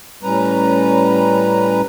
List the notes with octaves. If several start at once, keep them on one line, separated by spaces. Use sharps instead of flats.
A2 G3 C#4 B4 A#5